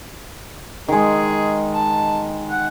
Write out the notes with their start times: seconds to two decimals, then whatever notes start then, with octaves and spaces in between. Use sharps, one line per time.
0.89 D#3 G#3 G#4
1.74 A5
2.50 F#5